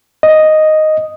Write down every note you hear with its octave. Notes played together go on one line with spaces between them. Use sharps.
D#5